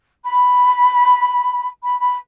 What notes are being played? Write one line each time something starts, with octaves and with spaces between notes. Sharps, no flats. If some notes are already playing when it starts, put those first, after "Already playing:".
B5
B5
B5